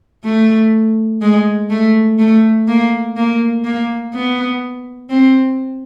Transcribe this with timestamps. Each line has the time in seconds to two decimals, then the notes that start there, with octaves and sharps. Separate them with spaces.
0.24 A3
1.22 G#3
1.70 A3
2.18 A3
2.68 A#3
3.16 A#3
3.64 A#3
4.14 B3
5.10 C4